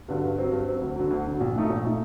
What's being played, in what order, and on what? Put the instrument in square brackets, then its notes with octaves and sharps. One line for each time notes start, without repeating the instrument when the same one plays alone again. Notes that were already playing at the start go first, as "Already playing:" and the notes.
[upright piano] G2 D3 F#3
G2
F#3 C4
G2
F#3 C4
D2
D3 F#3
D2
D3 F#3
A#1
A#2 A3 D#4
A#1
A#2 A3 D#4